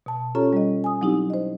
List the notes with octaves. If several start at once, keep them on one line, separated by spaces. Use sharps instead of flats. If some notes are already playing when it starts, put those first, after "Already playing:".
B2 A5
C#4 F4 G4 A4 C#5 A#5
G3 D#5
G#5 D#6
F#3 C4 D#4 E4 G4
C5 D#5